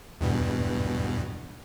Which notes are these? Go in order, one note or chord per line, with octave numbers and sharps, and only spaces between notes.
E2 G2 B2